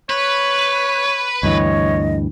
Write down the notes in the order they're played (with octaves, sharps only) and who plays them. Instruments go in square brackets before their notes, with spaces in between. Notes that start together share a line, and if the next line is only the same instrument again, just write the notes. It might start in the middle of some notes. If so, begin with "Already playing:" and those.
[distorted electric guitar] B4 [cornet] C#5
[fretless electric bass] D2 G2 E3 [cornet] C#5 [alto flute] D#5